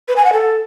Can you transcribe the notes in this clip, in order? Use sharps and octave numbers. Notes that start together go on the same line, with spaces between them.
B4
G#5
F#5
A4